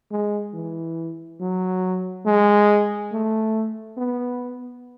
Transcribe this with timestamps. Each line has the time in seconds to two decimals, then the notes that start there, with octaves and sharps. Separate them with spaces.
0.11 G#3
0.54 E3
1.40 F#3
2.25 G#3
3.12 A3
3.98 B3